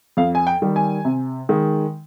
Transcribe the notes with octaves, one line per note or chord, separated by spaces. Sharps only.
F2 F5
G#5
G5
D#3 G3
G#5
C3
D#3 G#3